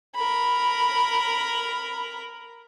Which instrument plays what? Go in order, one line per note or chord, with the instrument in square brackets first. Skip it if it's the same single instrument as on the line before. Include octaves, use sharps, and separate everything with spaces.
[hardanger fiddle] A#4 B5